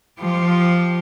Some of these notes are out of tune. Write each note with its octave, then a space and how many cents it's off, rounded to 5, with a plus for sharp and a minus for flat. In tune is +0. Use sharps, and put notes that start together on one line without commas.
F3 +0 G4 +0